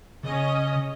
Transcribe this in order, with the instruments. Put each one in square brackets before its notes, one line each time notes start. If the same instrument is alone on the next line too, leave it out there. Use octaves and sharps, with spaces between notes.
[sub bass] C#3 [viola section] C#4 D#5